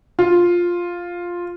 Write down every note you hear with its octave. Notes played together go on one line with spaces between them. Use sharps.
F4